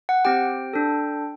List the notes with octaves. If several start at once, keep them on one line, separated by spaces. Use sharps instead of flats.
F#5
C4 G4 G5
D4 A4